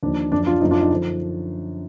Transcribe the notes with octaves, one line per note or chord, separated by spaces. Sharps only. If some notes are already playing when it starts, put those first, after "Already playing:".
D#2 D3 F3 D4
F#2 D3 F3 D4
D4 F4
F#2 D3 F3 D#4
D4 F4
D#4
D3 F3